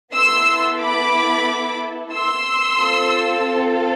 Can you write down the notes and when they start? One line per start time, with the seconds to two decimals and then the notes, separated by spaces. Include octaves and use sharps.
0.14 B3 E4 A4 C6 E6
0.81 B5 D6
2.13 C6 E6
2.79 C4 F4 A4